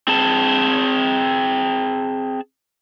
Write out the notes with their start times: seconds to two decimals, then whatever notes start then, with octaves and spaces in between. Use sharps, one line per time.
0.08 C4 G#4 A5